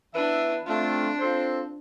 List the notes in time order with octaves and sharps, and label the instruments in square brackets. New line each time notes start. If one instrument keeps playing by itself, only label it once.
[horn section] E3 B3 E4 B4 E5 [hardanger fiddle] D4
[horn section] A3 C4 F4 [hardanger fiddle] D4
[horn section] C4 F4 A4 C5